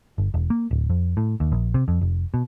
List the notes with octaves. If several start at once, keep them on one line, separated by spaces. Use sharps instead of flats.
G1
E1
A#3
D1
F2
A2
D#2
A#1
C3
F2
F1
B2